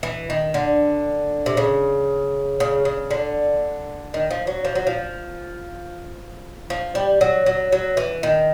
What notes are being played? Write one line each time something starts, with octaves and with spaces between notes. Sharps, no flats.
E3
D#3
D3
C3
C#3
C#3
C#3
D3
D#3
F3
F#3
F3
F#3
F3
F3
G3
F#3
F#3
F#3
E3
D#3